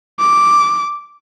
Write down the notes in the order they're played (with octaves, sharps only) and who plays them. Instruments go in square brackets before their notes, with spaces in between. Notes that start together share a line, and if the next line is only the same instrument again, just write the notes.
[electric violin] D6